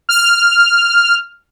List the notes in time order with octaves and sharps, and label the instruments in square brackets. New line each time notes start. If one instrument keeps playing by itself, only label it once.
[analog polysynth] F6